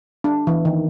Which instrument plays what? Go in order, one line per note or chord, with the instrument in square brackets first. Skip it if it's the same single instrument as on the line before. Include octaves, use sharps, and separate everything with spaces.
[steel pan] D4
E3
D#3